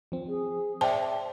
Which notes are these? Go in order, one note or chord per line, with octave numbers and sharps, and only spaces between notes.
F3 C4
G#4
C5 D5 E5 G5 A5